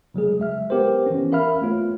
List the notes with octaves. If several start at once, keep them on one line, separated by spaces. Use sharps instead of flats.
C#3 F#3 G#3 G#4
G#3 E5 F6
B3 G4 A#4 C5
E3 C#4
A#4 E5 F5 B5 F6
A3 B3 F4 C#5